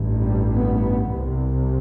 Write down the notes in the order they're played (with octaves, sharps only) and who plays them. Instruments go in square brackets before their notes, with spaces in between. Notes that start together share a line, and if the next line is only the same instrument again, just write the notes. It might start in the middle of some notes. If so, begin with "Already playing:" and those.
Already playing: [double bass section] A1 G2
G3
B3
C2 C3